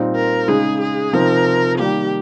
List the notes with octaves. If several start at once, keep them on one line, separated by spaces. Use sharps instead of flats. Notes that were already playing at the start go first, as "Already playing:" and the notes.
Already playing: A#2 G3 C4 D#4
A#4
C#3 G#3 D#4 G#4
G#4
C3 F3 C4 D#4 A#4
D#3 G3 A#3 G4